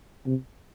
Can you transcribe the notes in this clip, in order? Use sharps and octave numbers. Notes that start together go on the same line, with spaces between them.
C3